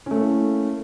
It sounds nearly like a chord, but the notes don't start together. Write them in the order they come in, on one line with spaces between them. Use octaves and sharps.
C#4 A3 A#3 E4